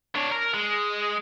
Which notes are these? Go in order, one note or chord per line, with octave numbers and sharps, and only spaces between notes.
D4 C#5
A#4
G#3